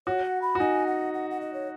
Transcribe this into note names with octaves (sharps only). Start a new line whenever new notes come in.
F#4 C#5
F#5
B5
F#4
D#4 G#5
F#5
F#5
F#5
D#5
C#5